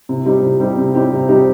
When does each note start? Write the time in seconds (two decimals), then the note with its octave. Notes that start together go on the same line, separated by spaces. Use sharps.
0.09 C3
0.25 G3 C4 D#4 G4
0.43 C3
0.60 G3 C4 D#4 G4
0.77 C3
0.95 G3 C4 D#4 G4
1.12 C3
1.29 G3 C4 D#4 G4